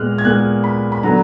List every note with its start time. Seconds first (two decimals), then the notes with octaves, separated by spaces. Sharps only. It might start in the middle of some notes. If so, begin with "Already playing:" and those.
Already playing: A#2 G#3 B3 F6 F#6
0.18 G#6
0.25 A#2 G#3 B3 F#6
0.64 B5
0.92 B5
1.03 D3 F#3 B3 A#5